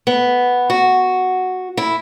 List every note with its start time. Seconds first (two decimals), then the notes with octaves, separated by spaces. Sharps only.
0.07 B3
0.70 F#4
1.77 E4